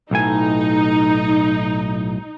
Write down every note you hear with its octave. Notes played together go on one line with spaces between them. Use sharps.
B1 A2 D#4 G#5